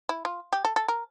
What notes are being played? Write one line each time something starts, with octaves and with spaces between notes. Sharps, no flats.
E4
F4
G4
A4
A4
A#4